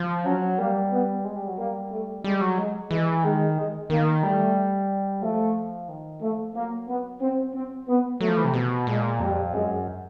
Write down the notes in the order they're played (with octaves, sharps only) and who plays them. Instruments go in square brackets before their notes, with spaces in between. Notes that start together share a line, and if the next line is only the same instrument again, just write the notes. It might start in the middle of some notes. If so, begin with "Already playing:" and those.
Already playing: [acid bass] F3
[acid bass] F#3 [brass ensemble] C#4
[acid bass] G3 [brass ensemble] A#3
[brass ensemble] B3
[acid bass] G#3
G3
F#3
[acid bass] G3 [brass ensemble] A#3
[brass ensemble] A3
[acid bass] G3 [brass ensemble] G#3
[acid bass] F#3
[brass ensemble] G#3
[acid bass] E3 [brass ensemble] G#3
[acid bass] D#3 [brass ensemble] G#3
[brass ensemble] G#3
[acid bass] D#3 [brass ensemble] A#3
[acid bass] G3 [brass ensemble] A3
[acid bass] F3 [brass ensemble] A3
[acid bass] D#3
[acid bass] F3 [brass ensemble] A3
[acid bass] F#3 [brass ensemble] A#3
[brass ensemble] B3
C4
C4
[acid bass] G3 [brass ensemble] B3
[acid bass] F#3 [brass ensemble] A3
[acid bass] F3
E3
C3
B2
[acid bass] A#2 [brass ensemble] G#3
[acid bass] F2 [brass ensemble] G3
[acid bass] F#2 [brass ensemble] G#3